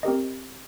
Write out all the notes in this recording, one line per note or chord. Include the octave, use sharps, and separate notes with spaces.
C4 G4 A#4 D#5